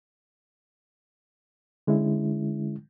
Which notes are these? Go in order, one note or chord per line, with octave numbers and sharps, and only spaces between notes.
D3 G#3 C#4 E4